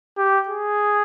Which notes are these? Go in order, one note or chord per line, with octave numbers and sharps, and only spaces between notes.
G4
G#4